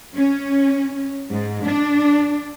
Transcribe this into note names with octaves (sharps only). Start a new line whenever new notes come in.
C#4
G#2
D4